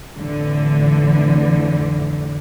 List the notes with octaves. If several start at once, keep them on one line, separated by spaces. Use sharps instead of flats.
F2 A2 D3 E3